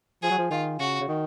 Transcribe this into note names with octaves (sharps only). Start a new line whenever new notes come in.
F3 G#4
F#3
F3
D#3 F4
C#3 F#4
C#3
D#3